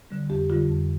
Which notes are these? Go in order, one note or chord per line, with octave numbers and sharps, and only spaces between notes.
D3 G3
F2 G4
D3 G3 F4
F2